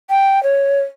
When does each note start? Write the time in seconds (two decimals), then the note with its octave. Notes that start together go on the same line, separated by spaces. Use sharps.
0.10 G5
0.43 C#5